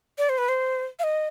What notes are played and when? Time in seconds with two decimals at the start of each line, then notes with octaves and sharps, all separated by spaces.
0.18 D5
0.29 C5
0.38 B4
0.49 C5
0.99 F5
1.03 D#5